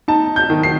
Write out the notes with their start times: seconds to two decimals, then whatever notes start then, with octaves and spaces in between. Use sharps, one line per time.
0.08 D#4 A5
0.36 G6
0.50 D#3
0.63 C7